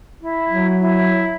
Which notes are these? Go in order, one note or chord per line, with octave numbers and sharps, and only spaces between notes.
E4
F#3
E4